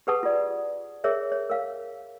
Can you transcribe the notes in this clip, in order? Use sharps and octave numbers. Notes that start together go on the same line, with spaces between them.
G4 G#4 B4 F#5 A5 D#6
F4 D5
G#4 A#4 C#5 E5
C#5
A#4 F5